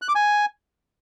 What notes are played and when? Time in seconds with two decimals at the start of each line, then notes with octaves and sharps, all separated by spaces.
0.02 F#6
0.08 D6
0.15 G#5